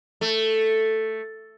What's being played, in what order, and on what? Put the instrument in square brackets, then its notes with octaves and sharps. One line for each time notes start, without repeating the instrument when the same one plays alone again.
[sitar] A3